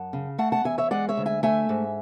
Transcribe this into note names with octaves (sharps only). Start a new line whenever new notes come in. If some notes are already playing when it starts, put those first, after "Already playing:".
Already playing: F#2 F#5 A5
C#3
A3 F#5 A5
F#5 A5
E2 E5 G#5
C#5 E5
G#3 D5 F#5
C#5 E5
D2
E5 G#5
A3 E5 G#5
G#2